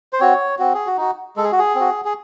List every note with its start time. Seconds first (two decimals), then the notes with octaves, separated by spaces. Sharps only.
0.13 C5
0.20 C4 F#4 C#5
0.59 C4 F#4
0.74 G#4
0.86 F#4
0.97 D#4 F#4
1.37 G#3 A4
1.44 G#4
1.52 F#4
1.59 G#4
1.75 C4 F#4
2.05 G#4